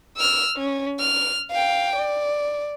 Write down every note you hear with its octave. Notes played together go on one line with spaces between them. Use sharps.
E6 F6
C#4
F6
F5 G5
D5